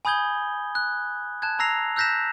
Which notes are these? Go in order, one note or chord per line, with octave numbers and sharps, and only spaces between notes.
G#5 B5 D#6 G6 G#6 G7
F#6
A5 F#6 G#6
A5 A#5 E6 A#6 C7 F7
E6 F#6 G6 A#6 B6 E7